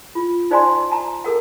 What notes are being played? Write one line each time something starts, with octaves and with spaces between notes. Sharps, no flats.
F4
D#4 C5 D5 G#5 A#5 C6
A5 A#5
A4 A#4 F#5